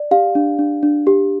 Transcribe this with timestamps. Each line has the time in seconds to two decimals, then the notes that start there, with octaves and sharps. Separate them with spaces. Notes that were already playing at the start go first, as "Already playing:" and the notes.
Already playing: D5
0.11 G4 F5
0.35 D4
0.59 D4
0.83 D4
1.07 G4